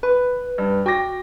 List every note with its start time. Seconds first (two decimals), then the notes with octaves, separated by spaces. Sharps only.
0.03 B4 B5
0.58 G2
0.86 F#4 G5 D6 A#6